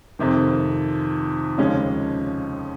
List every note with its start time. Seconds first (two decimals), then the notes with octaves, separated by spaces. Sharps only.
0.19 F2 C3 D#3
1.58 D#2 C#3 F3 G#3 C#4